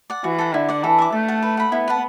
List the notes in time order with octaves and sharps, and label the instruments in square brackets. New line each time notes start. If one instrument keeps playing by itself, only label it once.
[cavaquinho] D5 F#5
[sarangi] E3 [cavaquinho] F#4
[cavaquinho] A4 F#5
[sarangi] D3 [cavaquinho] E4
[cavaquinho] D5 F#5
[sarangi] E3 [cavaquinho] A4
[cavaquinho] E5 A5 D6
[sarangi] A3 [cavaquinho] A4
[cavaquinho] F#5 A5
B4
F#5 B5
[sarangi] B3 [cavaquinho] E4
[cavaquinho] B4 F#5 A5